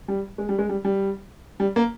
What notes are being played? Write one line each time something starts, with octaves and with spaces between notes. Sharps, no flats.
G3
G#3
G3
G#3
G3
G3
G3
A#3